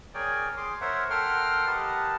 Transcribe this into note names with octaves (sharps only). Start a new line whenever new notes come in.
G#4 A#4 C#5 D5 G5 G#5
G#4 C6 D6
A#4 C5 C#5 E5 F#5
A4 A#4 F#5 G5 C6 F6
G4 A#4 B4 D#5 F#5 A5